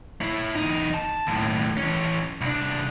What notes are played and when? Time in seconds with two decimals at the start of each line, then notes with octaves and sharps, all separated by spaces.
0.21 E4 C#5
0.56 E2 D#4
0.94 A5
1.27 D#2 A2
1.77 E3 C#4
2.41 C2 D4